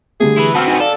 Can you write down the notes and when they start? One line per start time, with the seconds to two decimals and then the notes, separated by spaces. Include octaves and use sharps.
0.20 D3 G3 A3 G#4
0.37 E4 B4
0.55 B3 C4 F#4 A5 E6 F6
0.67 D#4 G#5
0.80 A4 D5 F5